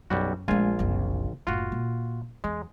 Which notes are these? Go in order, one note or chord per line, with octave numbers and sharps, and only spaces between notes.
B1 F#2 G3 F#4
A#1 G#3 A3 F4 G#5
F#1 C2
F#1 A2 F4 F#4
A#2
E2 G#3